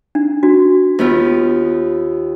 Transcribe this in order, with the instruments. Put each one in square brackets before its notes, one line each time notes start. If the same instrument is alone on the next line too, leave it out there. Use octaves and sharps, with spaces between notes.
[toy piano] D4
D4 F#4
[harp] D#2 B3 F4